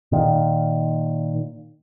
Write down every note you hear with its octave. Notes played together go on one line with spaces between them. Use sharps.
A#2 D#3